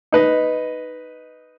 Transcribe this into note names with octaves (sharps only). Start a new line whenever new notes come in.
D#4 B4 D#5